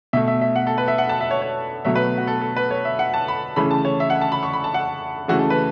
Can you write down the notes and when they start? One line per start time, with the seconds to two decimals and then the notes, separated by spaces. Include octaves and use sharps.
0.13 B2 A3 E5
0.28 E5
0.42 E5
0.56 F#5
0.67 A4
0.78 B4
0.88 E5
0.98 F#5
1.09 A5
1.21 E5
1.31 C#5
1.42 C#5
1.85 B2 F#3 A3 E5
1.95 B4
2.17 F#4
2.27 A4
2.41 A4
2.56 B4
2.71 C#5
2.85 E5
2.99 F#5
3.14 A5
3.28 B5
3.56 C#3 E3 A3 B5
3.71 A5
3.85 C#5
4.00 E5
4.10 F#5
4.21 A5
4.32 B5
4.43 C#6
4.53 B5
4.64 A5
4.74 F#5
5.28 C#3 E3 A3 F#4
5.39 A4
5.50 B4